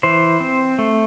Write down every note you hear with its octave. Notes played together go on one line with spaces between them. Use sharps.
E3 C5
C4
A3